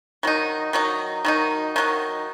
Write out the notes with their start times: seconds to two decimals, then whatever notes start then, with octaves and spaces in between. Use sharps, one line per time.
0.23 D#3 F#3 D#4
0.73 D#3 F#3 D#4
1.25 D#3 F#3 D#4
1.76 D#3 F#3 D#4